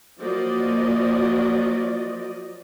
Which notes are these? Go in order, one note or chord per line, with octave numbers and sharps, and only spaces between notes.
F3 F#3 A#3 D5 D#5